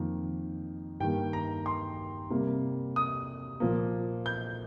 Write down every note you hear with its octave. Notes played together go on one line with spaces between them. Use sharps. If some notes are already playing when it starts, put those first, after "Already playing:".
Already playing: F2 D#3 A#3
G2 D#3 A#3 G5
A#5
C6
C3 G3 A#3
D#6
A#2 F3 A#3
G6